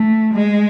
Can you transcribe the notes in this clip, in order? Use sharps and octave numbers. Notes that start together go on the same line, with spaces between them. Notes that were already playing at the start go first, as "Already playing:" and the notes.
Already playing: A3
G#3